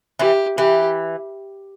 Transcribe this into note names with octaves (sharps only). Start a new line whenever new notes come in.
E3 G4
E3 G4